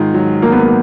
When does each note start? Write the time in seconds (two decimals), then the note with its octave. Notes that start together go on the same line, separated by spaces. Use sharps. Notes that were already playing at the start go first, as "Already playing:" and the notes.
Already playing: G#2 D#3 F4
0.14 F#3
0.42 F#3 A#3
0.52 B3
0.60 A#3